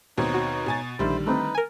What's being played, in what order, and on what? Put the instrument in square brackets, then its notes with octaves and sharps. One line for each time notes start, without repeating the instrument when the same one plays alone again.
[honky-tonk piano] D#2 B2 C4 [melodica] D#4 C#5
[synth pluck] F#4
[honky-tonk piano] B2 G#5 A6
[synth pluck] A#1 [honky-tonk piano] D3 D#3 G3 [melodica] E4 C5
[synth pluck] A3 C4 [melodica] D#4 B4
[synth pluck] A#4 G#5